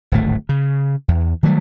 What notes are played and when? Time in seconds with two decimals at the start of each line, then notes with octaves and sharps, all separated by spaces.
0.12 D1 G#1 A3
0.49 C#3
1.08 E2
1.43 D#3 F#3 G3 A3